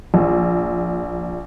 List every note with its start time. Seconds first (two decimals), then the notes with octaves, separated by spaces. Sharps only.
0.14 A#1